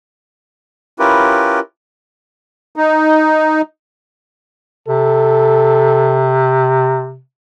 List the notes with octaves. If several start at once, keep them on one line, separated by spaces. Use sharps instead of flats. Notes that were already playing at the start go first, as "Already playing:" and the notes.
C#4 E4 F4 G4 A#4 B4
D#4
C3 A4